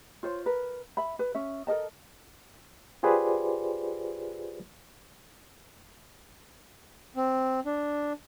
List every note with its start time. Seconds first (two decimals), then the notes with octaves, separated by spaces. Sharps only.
0.23 F4 C5 C#5
0.46 A#4 B4
0.97 E5 B5
1.19 B4
1.35 C#4 E5
1.67 A4 A#4 D#5 A5
3.03 F4 G4 G#4 B4 C5 D5
7.16 C4
7.66 D4